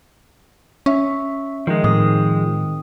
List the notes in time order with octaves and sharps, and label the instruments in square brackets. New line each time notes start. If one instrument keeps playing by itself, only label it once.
[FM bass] C#4 [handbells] E5 C#6
[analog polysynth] D#3 [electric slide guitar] F3 G#3
[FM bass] A2 [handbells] C4 D#6